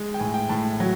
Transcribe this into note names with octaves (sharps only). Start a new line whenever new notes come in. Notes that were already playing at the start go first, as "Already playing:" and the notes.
Already playing: G#3
G5
A2 G#5
G5
A2 A5
F#3